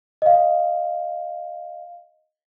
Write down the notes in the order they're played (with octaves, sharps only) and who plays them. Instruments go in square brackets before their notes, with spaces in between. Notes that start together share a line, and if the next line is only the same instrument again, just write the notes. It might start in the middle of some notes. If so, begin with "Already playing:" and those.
[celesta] D#5 F5